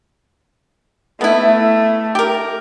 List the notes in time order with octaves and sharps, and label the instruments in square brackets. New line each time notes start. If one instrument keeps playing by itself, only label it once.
[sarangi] A3 [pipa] B3 E4
[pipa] G4 A#4